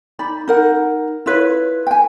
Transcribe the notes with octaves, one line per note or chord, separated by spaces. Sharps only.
D#4 D5 B5
D#4 A#4 F#5
E4 F4 B4 C#5
G5 G#5